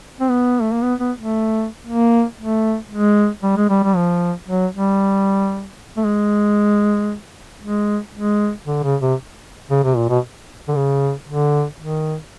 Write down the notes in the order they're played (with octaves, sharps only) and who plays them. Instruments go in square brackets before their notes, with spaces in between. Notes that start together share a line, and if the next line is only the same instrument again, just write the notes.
[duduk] C4
B3
A3
A#3
B3
B3
A3
A#3
A3
G#3
G3
G#3
G3
G3
F3
F#3
G3
A3
G#3
G#3
G#3
D3
C#3
C3
C#3
C3
A#2
B2
D3
C#3
D3
D#3